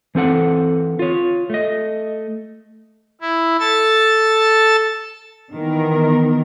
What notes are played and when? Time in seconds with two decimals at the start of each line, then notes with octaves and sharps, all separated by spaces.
0.15 E3 C4 A4 F#5
0.99 F4 C#5
1.50 A3 D#5
3.21 E4
3.60 A4 A5 A6
5.53 D#3 E3 B3 A#4